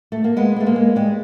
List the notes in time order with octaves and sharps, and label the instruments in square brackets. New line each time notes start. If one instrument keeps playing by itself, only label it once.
[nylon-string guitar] A3
A#3
G#3 B3
G#3 A3
A#3
G#3
G3 G#3